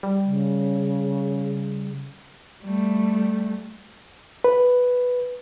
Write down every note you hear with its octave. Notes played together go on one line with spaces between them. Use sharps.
G3
C#3
G3 A3
B4